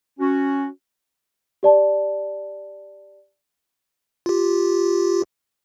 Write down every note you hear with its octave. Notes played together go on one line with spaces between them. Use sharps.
C#4 F#4
G4 D5 A5
F4 G4